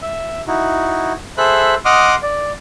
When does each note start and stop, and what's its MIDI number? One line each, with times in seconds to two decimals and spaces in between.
0.02 0.41 76
0.48 1.13 63
0.48 1.13 64
0.48 1.13 66
1.38 1.74 68
1.38 1.74 69
1.38 1.74 72
1.38 1.74 76
1.38 1.74 83
1.38 1.74 90
1.85 2.15 75
1.85 2.15 78
1.85 2.15 84
1.85 2.15 86
1.85 2.15 87
1.85 2.15 89
2.23 2.52 74